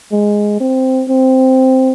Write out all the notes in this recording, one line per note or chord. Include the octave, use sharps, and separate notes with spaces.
G#3
C4
C4